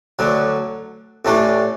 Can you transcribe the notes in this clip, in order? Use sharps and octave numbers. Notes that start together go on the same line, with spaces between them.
D2 D3 F#3
A1 A2 E3 A3 D4